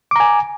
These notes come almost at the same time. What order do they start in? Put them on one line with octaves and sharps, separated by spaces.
D6 A#5 G#5